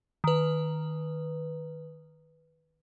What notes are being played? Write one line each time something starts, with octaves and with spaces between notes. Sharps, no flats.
D#3 B4